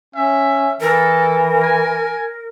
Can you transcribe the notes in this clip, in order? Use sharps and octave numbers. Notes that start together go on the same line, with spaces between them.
C#4 E5
E3 A4 A#4
G#5